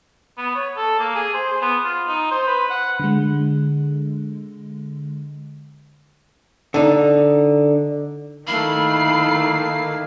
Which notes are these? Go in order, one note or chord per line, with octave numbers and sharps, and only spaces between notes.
B3
C#5
A4
A#3
G#4
C5
B3
F4
D#4
C5
B4
F#5
D3 G#3
D3 D#4
D#3 A3 A#3 E4 F5 B5 C7